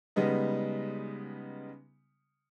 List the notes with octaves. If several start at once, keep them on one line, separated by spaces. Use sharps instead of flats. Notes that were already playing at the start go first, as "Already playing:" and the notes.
C#3 G3 G#3 B3 D#4